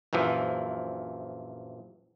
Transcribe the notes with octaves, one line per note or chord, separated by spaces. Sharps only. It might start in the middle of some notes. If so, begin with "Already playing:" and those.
A#1 F#2 E3 F3